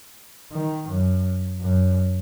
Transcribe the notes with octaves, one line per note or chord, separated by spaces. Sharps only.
D#3
F#2
F#2